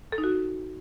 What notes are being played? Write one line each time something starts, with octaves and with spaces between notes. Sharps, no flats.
A4
D#4
F#4